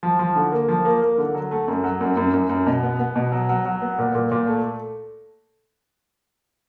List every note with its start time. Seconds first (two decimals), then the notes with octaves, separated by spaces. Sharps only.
0.03 F3
0.19 F3
0.36 D3
0.52 A#3
0.69 F3
0.85 A#3
1.02 A#3
1.18 D3
1.35 F#3
1.51 A3
1.68 F#2
1.84 F#3
2.01 F#2
2.17 F#2
2.34 F#2
2.49 F#2
2.66 B2
2.83 B3
2.99 B3
3.16 B2
3.32 F#3
3.49 F#3
3.65 F#3
3.82 B3
3.98 A#2
4.15 A#2
4.31 A#2
4.47 A3